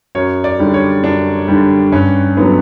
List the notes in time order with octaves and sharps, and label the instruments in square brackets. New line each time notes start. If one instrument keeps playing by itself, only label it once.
[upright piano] F#2 C#5
D5
D3 G3
C#5
F#2 D4
D3 G3
G2 C#4
D3 F#3 B3